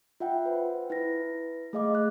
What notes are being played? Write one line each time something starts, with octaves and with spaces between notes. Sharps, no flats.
F4 E5 F#5 G5
B4 C5
E4 B4 A#6
A3 G#4 D#5 F5 D6
F#6